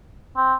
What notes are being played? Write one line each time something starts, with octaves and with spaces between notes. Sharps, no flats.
C4